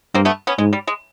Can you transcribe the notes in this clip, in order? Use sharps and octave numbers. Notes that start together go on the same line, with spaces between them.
G2 A#3 C4
A3 B3
B3 C#4
G#2 G#3
G3
G#3